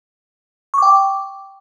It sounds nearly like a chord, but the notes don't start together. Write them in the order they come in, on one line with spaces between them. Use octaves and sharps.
C#6 D6 G5